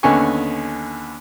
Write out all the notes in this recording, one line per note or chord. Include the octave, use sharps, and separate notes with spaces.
D#2 D3 B3 C#4 G#5 C#6